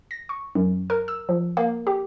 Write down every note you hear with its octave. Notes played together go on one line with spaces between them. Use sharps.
A#6
C#6
F#2
A#4
E6
F3
A#3
G4